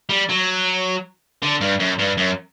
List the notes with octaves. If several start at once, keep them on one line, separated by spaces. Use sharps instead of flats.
G3
F#3
D3
G2
F#2
G2
F#2